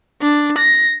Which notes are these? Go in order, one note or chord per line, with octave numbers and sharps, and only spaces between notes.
D4
A#6